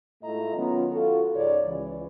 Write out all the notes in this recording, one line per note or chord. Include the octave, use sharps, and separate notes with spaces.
G#2 A3 E4 F4 D#5 A#5
D#3 F#3 B3 C#4 F4
C#4 F4 F#4 A4
C#2 G#2 D#4 C#5 D5
C#2 E3